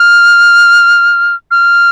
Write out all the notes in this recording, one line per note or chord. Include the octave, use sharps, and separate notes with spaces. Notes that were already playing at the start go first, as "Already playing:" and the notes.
Already playing: F6
F6